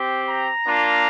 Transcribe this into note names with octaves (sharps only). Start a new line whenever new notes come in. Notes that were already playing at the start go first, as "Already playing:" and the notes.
Already playing: C4 G4
A#5
A#3 D4 F4